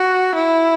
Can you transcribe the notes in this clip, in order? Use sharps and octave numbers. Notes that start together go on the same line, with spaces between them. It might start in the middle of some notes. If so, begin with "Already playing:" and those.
Already playing: F#4
E4